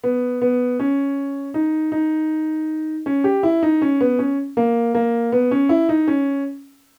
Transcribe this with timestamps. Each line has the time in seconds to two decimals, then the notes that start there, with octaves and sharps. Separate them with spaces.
0.04 B3
0.42 B3
0.80 C#4
1.54 D#4
1.92 D#4
3.06 C#4
3.24 G4
3.43 E4
3.63 D#4
3.82 C#4
4.01 B3
4.19 C#4
4.57 A#3
4.95 A#3
5.32 B3
5.51 C#4
5.69 E4
5.89 D#4
6.08 C#4